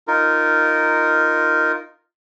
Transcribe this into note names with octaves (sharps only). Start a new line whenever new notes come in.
D#4 F4 A#4